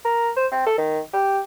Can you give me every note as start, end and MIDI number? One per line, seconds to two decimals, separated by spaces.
0.05 0.31 70
0.37 0.47 72
0.52 0.65 60
0.67 0.74 69
0.78 1.00 51
1.13 1.39 67